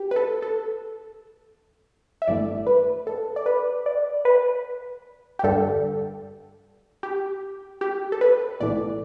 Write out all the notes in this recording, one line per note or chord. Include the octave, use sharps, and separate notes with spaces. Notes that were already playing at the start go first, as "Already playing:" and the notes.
Already playing: G4
B4
A4
A4
E5
G1 G2 E3 A3 D5
B4
A4
D5
B4
D5
B4
G4
G2 D3 G3 A4
G4
G4
A4
B4
B1 A2 E3 A3 D5